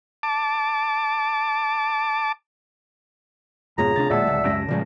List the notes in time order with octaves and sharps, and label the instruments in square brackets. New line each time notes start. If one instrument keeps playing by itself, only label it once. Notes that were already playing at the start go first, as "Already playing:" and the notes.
[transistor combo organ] A5 D6
[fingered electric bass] F2 G#2 B2 [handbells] F4 G#4 C#5 [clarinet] A#5
[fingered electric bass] D2 C3 D4 [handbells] A6
[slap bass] D1 G#3 [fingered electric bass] A#1 A#2 [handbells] D5 F#5 A5 [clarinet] E5
[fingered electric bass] C#2
[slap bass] F#2 G#3 C#4 [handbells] A5 A#6 D7
[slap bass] D2 A2 C#4 [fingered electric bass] C#3 F3 G#3 [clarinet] G3